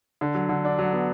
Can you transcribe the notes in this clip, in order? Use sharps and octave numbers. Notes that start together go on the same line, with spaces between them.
D3
F#3
D3
D4
F#3
B3